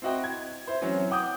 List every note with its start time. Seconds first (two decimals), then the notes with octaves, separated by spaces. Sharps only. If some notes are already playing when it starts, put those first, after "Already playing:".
0.02 C4 E4 F#4 D#5 G5
0.24 G#6
0.67 E4 C5
0.81 E3 F#3 C4 C#4
1.10 F#5 G5 D6 D#6 G6